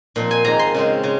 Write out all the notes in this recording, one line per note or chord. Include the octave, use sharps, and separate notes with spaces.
A#2 F3 C4
G#5
G#2 D#3 A#3 F4 A#5
C6
C#3 G#3 C4
C#3